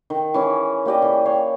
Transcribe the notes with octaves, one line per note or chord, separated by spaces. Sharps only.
D#3
E3 C#4 G#4
A#3 G4 D5 D#5
E3 G#4
C#5 F5 G5